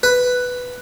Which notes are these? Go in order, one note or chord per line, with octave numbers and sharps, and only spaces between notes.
B4